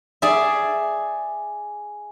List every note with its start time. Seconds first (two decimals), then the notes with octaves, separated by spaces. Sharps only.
0.22 G#4 D5 E5